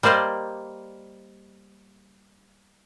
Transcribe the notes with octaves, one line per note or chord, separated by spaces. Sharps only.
G3 A#3 C5 D5 D#5